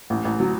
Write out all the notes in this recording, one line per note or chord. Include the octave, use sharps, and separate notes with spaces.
A1
A1
F#3